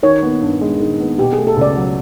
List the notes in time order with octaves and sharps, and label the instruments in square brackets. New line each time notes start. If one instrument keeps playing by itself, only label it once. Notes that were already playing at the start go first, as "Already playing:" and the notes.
[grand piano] D#3 [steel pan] C#5
[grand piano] B3
G2
G#3
D#3
B3
[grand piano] B2 [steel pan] G4
[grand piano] A3 [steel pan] G#4
[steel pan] A4
[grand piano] C#2 [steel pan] D5
[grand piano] F#3